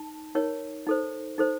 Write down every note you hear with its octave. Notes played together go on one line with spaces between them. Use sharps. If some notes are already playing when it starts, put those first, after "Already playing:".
Already playing: D#4 A5
D#4 A#4 C#5
D#4 A4 C5
D#4 A4 C5